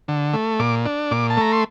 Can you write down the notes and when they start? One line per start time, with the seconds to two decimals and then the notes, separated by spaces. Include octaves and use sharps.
0.08 D3
0.34 A3
0.60 A#2 D6
0.85 D4
1.11 A#2 D6
1.30 A5
1.37 A3 A#5
1.53 C6